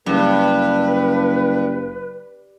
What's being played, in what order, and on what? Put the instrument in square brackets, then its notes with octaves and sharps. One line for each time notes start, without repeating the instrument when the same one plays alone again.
[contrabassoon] F#1 [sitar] G2 [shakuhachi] B4